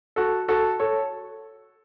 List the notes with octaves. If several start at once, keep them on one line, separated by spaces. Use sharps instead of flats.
F#4 A4
F#4 A4
A4 C#5